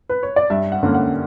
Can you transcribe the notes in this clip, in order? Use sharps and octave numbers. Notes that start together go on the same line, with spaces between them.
B4
C#5
D5
G2 E5
F#5
D3 A#3 C#4
F#5